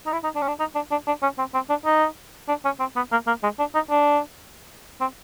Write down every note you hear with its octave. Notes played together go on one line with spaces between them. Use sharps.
D#4
E4
D#4
D4
C#4
D4
D#4
D4
D4
D4
C#4
C4
C4
D4
D#4
D4
C#4
C4
B3
A#3
A#3
G#3
D4
D#4
D4
C4